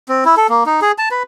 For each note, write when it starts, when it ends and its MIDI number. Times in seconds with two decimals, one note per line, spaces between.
0.09 0.24 60
0.25 0.35 64
0.37 0.47 69
0.49 0.64 58
0.66 0.80 63
0.82 0.92 68
0.98 1.09 81
1.11 1.23 71